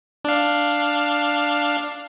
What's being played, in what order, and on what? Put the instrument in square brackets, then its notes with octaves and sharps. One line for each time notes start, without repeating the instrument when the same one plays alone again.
[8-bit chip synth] D4 F5